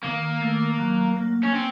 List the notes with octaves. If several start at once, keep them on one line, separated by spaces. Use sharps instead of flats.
D#3 A#3
A3
F#3
A#3
C#4
C4 C#4